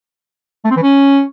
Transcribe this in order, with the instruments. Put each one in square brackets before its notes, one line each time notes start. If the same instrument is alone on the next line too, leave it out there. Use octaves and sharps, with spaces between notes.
[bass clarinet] A3
C4
E3
C#4